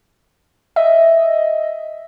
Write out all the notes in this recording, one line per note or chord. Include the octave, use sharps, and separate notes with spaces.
D#5 E5